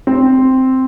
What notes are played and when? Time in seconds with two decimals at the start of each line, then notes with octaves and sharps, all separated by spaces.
0.07 C4